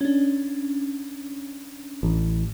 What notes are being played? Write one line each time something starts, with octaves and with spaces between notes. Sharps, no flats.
C#4 D4
A1